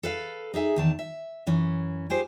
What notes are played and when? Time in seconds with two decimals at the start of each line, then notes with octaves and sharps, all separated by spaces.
0.03 A4 B4 F5
0.54 D#4 G#4 E5 G#5
0.76 E2 D#3 A5
0.99 E5
1.47 F#2 E3 C#4
2.10 F4 G4 G#4 C5